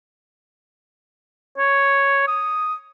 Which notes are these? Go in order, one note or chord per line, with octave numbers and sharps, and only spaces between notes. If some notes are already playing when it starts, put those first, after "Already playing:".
C#5
D#6